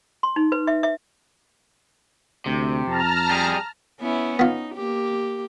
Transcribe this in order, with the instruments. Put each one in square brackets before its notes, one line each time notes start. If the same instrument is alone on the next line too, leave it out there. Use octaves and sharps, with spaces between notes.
[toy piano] C6
D#4
B4
E5
E5
[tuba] D2 [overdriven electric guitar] C3
[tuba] F2 [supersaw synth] A5 A#5 F6
[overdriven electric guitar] G3 G#4
[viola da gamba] B3 C#4 E4
[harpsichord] B3 F4 [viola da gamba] D#4
[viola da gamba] A#3 G4